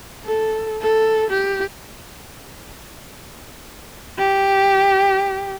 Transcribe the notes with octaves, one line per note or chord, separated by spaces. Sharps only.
A4
A4
G4
G4